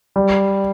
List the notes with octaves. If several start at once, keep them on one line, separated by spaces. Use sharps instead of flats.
G3